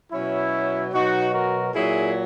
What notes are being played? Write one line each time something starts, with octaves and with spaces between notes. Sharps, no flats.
B2 F#3 C#4 E4
B2 F#3 D#4 F#4
F#4 A#4
A#2 F#3 E4 G#4